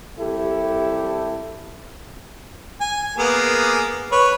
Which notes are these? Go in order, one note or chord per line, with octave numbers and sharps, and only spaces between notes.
C2 E4 G4 A4
G#5
A#3 B3 G#4
B4 C#5